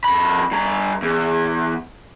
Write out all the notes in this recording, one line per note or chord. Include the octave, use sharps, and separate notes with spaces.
F2 B5
G2 A#5
E2